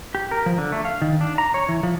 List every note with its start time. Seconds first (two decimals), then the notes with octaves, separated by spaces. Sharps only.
0.15 G4
0.31 A#4
0.46 F3
0.58 D3
0.72 A3
0.85 F5
1.02 D#3
1.21 D4
1.38 A#5
1.54 C#5
1.69 E3
1.83 F3